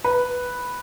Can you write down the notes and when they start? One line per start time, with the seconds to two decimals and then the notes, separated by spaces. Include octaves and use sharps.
0.04 B4